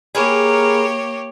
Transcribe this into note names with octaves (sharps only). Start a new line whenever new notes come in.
A#3 G4 G#4 A#4 B4 C#5